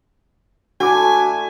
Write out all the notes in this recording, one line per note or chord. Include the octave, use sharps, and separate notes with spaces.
A3 D4 E4 F#4 G#5 D6